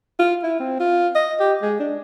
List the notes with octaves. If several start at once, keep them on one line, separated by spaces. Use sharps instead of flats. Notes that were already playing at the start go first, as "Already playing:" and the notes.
F4
E4
C4
F4
D#5
G4
G#3
D4